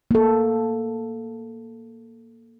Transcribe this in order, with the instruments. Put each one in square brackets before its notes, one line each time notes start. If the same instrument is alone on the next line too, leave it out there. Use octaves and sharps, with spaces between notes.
[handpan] A#3 A4